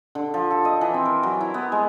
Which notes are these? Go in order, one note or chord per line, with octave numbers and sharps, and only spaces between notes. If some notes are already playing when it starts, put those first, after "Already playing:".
D3
F3
A4
D#5
E3
C4
A#4
F#3
E4
B3
G#3